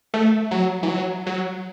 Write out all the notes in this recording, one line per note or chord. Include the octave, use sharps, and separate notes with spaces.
A3
F#3
E3
F#3
F#3